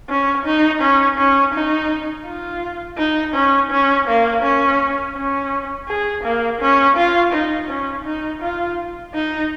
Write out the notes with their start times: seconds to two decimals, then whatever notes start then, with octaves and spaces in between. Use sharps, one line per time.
0.09 C#4
0.45 D#4
0.82 C#4
1.18 C#4
1.54 D#4
2.26 F4
2.98 D#4
3.34 C#4
3.71 C#4
4.08 A#3
4.43 C#4
5.16 C#4
5.89 G#4
6.24 A#3
6.61 C#4
6.97 F4
7.33 D#4
7.69 C#4
8.05 D#4
8.42 F4
9.14 D#4